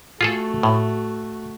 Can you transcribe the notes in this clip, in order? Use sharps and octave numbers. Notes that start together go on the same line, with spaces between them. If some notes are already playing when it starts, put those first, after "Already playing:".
A3 F4 F#4 G#4 A4
A2